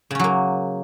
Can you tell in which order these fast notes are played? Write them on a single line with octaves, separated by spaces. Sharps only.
C#3 C#4 F#3 A#3